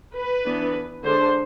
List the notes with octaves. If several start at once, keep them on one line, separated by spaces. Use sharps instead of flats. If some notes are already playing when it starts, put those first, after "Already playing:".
B4
E3 B3 D4
D3 G#3 D4 C5